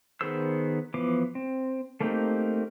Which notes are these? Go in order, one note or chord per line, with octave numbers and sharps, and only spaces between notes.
D#3 B3 G#4 C5 E6
E3 F3 B3 D6
C4
A3 A#3 C4 D#4 G4